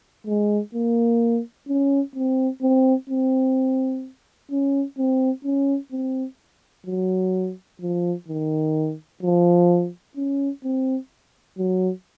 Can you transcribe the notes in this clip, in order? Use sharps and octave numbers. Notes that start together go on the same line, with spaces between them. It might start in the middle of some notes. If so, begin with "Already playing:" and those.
G#3
A#3
C#4
C4
C4
C4
C#4
C4
C#4
C4
F#3
F3
D#3
F3
C#4
C4
F#3